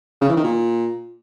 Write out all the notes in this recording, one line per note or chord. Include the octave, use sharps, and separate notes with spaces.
C#3
E3
D#3
A#2